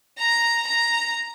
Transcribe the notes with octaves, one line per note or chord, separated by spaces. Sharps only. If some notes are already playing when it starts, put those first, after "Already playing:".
A#5
A#5